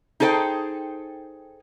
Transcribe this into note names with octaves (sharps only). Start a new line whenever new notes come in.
D#4 G#4 A4 C5 G5